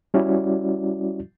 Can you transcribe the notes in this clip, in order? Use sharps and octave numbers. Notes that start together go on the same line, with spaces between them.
G3 C#4 E4 F#4 D5